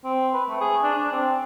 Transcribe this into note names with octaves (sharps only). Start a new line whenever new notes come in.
C4
B4
A3
G#4
D4
D4
C4